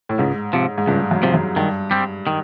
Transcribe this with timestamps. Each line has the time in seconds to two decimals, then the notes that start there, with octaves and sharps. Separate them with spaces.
0.09 A2
0.19 C#2 G#2
0.53 C3 F3
0.78 G#2
0.87 C#2 G2
1.11 F#2
1.23 C3 F3
1.34 F#2
1.56 G2 D#3
1.91 G3 C4
2.27 D#3